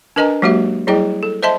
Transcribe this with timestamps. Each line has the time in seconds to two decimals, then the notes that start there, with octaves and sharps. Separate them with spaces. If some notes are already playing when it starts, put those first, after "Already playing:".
0.16 D4 A#4 B4 D#5 G#5 A#5
0.42 F#3 G#3 A#3 F#4 G4 E5
0.87 F#3 G3 E4 G#4 D#5 G5
1.23 A4
1.43 C5 D#5 E5 A5 C6